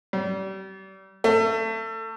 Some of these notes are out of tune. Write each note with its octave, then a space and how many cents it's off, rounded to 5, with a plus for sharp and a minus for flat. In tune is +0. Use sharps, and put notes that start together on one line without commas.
G3 -35
A3 +25